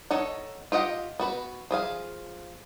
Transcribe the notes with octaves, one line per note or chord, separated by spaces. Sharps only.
D#4 A4 C#5 F#5
F4 G4 D#5 F#5
B3 F#4 B4
F3 G#4 F5